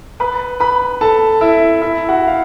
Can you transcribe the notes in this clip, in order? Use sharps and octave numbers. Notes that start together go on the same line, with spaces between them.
B4 B5
B4 B5
A4 A5
E4 E5
E4 E5
F#4 F#5
F5